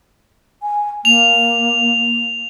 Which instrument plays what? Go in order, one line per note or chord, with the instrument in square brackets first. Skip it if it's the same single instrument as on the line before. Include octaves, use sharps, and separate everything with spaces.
[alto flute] G#5
[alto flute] A#3 [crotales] F7